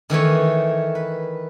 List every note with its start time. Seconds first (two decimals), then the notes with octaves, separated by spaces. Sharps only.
0.10 D#3 E3 A3 C#5
0.95 B4